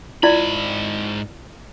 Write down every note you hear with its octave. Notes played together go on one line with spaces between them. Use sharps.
G#2 E4 F4 D5 B5